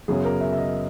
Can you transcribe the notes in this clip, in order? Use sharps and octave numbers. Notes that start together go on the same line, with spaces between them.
F#2 C#3 F#3 B3 G#4
A#4
E5
E5
D#5